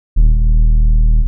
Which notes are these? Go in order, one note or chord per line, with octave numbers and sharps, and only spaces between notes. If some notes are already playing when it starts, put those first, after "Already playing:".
D#1